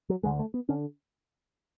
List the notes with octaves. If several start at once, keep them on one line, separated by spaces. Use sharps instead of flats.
F#3
D2 D3 G#3
A3
B3
D3 C#4